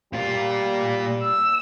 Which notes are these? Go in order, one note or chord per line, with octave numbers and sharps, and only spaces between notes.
A#2 G3 F4
E6